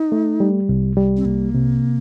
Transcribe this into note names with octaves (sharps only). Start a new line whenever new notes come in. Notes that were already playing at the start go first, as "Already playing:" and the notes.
Already playing: D#4
A3
G3
C2
G3
C4
C2 A#3
C3